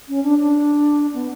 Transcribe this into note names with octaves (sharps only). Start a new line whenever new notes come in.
C#4
D4
D4
B3